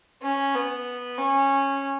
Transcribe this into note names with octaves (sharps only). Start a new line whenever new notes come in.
C#4
B3
C#4